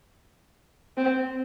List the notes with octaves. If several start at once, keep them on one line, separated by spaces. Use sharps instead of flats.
C4